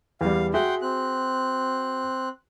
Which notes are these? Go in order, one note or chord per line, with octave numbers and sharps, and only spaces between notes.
E2 G3 F5
F#4 G#4 E5 F#5 G5 C6
C4 F#6